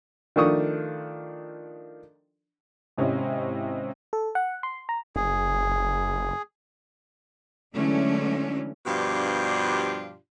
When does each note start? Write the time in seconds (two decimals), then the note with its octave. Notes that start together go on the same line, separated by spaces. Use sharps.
0.36 D#3 F3 A3 D4 C#6 D#6
2.97 G#1 C3 C#4 E4 D#5
4.13 A4
4.35 F#5
4.63 C6
4.89 A#5
5.16 F#1 G#4
7.74 D3 E3 F#3 G#3 A3 C#4
8.86 G2 B2 F3 D4 F4 G4